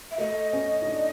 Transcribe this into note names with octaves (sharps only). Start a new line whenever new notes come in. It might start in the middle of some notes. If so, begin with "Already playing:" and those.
E5
A3 D#5
C#4
D#4
D4